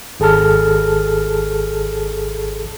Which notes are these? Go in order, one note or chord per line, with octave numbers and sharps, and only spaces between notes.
G#1 G#4 A4 A5 F6